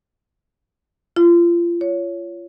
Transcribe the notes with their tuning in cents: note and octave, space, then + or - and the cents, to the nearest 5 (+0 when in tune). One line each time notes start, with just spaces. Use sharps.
F4 -30
C#5 +15